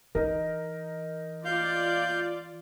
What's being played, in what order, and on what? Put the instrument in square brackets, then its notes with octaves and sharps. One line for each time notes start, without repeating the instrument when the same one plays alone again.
[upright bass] E3 [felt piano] D#4 A#4
[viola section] F4 D5 [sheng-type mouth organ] F5 G6